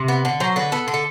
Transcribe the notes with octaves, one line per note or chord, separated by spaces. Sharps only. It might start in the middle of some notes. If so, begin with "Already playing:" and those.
Already playing: C3
B3
D3
F#3 C5
D3 B4
B3 A4
D3
A4